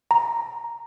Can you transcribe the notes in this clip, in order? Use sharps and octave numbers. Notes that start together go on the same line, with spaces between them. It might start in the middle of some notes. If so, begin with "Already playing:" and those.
A#5